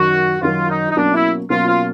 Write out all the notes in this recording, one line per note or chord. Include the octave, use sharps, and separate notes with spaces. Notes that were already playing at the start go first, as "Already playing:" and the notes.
Already playing: F#2 D#3 F#3 F#4
F#2 D#3 F#3 F4
D#4
D#4
B2 F#3 A#3 C#4 D4
E4
B2 F#3 A#3 C#4 F4
F4